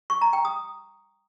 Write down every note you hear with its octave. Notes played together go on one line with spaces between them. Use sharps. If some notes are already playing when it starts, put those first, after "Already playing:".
C#6
A#5
G5
D#6